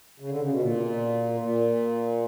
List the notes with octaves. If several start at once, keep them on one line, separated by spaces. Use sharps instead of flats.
C#3
D3
C#3
B2
A#2
A#2